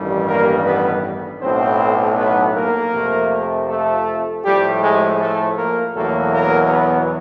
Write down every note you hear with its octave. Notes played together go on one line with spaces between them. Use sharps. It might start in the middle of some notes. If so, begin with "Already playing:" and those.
Already playing: A1 G2 D#3 G3
A#3 A#4
B3 B4
B1 A2 F#3 B3 C4 C5
B3 B4
A#3 A#4
F2 C3 F3 A3
A3 A4
A2 F3 G3 A3 G4
G#3 G#4
A3 A4
A#3 A#4
E2 B2 F#3 A3 A#3 A4
A#3 A#4
B3 B4